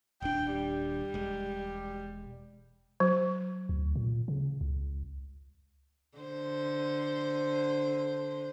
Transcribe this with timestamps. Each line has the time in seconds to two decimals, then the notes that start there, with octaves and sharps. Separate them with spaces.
0.22 D#1 D4 G5
0.53 G3
1.14 E1 G#3
3.00 F#3
3.69 D2
3.96 A#2
4.28 C#3
4.61 C#2
6.18 D3 C5